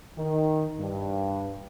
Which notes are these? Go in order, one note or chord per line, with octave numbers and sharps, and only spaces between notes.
D#3
G2